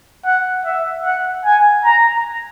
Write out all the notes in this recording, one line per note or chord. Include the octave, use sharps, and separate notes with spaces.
F#5
E5
F#5
G#5
A#5